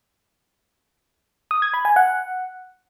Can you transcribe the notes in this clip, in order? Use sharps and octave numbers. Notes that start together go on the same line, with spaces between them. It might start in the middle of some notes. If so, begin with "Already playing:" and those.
D#6
G#6
B5
G#5
F#5